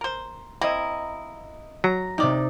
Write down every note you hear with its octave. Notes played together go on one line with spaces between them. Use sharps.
A#4 C5
A#3 C4 E4 D#5 A#5
F#3 A#5
C3 D#3 D#4 D5